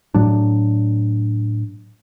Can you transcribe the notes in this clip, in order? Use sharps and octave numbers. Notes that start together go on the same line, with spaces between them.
A2 F#3 D4